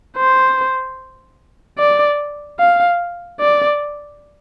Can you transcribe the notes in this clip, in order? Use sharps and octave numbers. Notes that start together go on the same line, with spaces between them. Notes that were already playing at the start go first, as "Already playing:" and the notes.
C5
D5
F5
D5